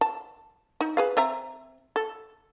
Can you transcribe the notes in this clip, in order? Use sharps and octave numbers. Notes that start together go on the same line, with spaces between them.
A5
D#4
G#4 B4 F5
C4 E5 A#5
A4